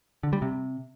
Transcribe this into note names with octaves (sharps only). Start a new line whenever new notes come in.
D3
G3
C3